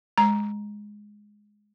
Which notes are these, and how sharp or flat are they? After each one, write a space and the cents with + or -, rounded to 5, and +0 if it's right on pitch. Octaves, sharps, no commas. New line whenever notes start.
G#3 +0 A#5 +5